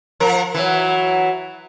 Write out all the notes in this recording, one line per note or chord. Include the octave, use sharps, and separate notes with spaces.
F3 A#4
E3 F#3